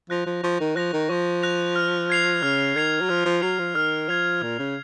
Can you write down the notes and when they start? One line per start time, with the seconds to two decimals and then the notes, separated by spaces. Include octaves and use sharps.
0.10 F3 F#6 A#6 F7
0.26 F3
0.43 F3 C#6
0.60 D#3
0.76 F3 F#6 A#6 F7
0.93 D#3
1.10 F3 C#6
1.43 F#6 A#6 F7
1.76 F6
2.10 G#6 C7 F7
2.43 C#3 F6
2.75 D#3 G#6 C7 F7
3.01 F#3
3.09 F3 F6
3.25 F3
3.42 F#3 G#6 C7 F7
3.59 F3
3.75 D#3 F6
4.09 F3 G#6 C7 F7
4.42 A#2 F6
4.59 C#3